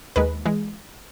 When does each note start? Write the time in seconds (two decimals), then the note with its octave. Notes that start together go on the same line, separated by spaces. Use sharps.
0.16 D#2 D#3 G#3 B4
0.46 E3 G#3